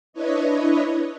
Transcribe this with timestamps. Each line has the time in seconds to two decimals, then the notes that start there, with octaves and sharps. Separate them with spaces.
0.13 D4 E4 B4 C#5 D#5